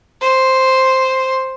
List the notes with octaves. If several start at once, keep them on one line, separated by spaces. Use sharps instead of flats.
C5